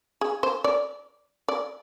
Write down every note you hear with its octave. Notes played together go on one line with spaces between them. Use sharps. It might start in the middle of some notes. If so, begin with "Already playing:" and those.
G#4
C5
D5
D5